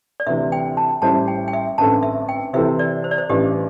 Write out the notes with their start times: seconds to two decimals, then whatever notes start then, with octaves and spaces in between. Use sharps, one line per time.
0.20 D5
0.27 D2 C3 E3 E5
0.52 G5
0.77 A5
1.02 A1 A2 G3 E4 C5 A5
1.28 G5
1.48 G5
1.53 E5
1.78 A1 G2 D3 C4 A4 A5
2.03 E5
2.29 G5
2.53 C3 E3 C4 E4 A4 E5
2.79 D5
3.04 C5
3.11 D5
3.18 C5
3.30 A1 G2 E3 G4